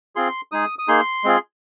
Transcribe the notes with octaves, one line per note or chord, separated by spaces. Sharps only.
C4 F4 G#4 C6
G#3 D#4 G#4 D#6
D#6
A#3 D#4 G#4 C6
G#3 C4 F4 G#4